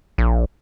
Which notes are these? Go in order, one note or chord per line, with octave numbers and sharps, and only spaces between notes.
A#1